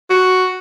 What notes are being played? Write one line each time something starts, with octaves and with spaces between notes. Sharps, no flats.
F#4